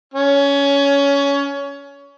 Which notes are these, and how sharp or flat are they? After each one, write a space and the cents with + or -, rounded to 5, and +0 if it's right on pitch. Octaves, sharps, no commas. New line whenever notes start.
C#4 +20